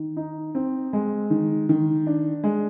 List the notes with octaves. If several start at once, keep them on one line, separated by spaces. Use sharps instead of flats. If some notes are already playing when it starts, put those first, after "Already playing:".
Already playing: D#3
D#4
C4
G#3
D#3
D#3
D4
G#3